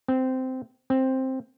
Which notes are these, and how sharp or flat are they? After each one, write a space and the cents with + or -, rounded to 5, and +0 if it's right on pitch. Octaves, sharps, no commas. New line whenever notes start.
C4 -15
C4 +5